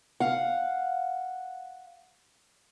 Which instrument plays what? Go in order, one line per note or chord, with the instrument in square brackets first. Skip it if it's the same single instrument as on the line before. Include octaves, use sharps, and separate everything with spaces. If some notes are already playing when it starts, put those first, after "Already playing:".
[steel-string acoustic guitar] F5 F#5